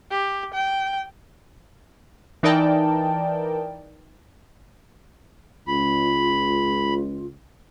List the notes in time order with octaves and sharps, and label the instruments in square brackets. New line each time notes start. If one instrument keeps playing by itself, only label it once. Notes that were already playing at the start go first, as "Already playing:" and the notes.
[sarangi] G4
G5
[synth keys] E3 D#4 A#4 D5 G5 A5
[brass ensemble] C#2 [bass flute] F4 [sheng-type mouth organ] B5